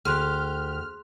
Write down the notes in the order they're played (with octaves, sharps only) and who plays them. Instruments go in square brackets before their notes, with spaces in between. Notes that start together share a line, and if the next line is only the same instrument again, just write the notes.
[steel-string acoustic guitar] D2 G4 [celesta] G#4 C6 F#6 [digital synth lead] F6